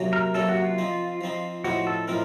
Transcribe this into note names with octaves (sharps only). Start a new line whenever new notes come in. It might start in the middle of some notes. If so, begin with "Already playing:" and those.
Already playing: C3 F#3 A#3 C#4
A#4
C3 F#3 A#3 C#4 A4
F#4
F4
F3 C4 D#4
F3 C4 D#4
A2 F3 C4 D#4 F#4
A4
A2 F3 C4 D#4 A#4